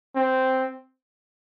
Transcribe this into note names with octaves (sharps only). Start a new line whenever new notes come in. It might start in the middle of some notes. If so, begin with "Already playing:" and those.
C4